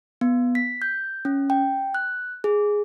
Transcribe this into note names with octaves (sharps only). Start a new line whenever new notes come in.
B3
B6
G6
C#4
G5
F#6
G#4